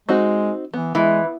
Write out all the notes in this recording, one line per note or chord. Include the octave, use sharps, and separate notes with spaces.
G#3 C4 D#4 F#4
E3 B3
E3 G#3